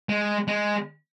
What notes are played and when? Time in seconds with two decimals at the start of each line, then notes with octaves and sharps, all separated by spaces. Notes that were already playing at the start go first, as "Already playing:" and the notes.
0.09 G#3
0.48 G#3